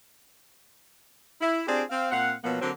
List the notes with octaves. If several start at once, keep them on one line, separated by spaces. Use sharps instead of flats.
E4
C4 D4 F4 G4 G#4 D5
C4 F5
A#2 C4 F5 F#5
B2 F3 F#3 A#3 B3
D3 F#3 A#3 C4